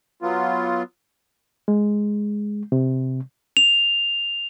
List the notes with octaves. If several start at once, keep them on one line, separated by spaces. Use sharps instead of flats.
F#3 B3 F4
G#3
C3
F7